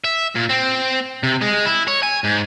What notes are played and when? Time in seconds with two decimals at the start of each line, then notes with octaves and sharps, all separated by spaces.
0.04 E5
0.35 A#2
0.49 C4
1.23 C3
1.41 G#3
1.66 E4
1.88 C#5
2.03 G#5
2.24 G#2